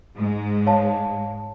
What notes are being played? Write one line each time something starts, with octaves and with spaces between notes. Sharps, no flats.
G#2 G#3
C#5 F5 A5